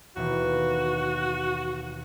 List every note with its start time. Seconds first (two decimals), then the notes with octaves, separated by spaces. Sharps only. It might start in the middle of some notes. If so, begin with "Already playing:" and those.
0.16 D#2 B2 E3 F#4